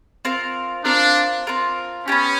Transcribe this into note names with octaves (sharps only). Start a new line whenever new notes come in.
C4 F4 A#4
C4 D4 F4 A#4
C4 F4 A#4
B3 C#4 D4 G4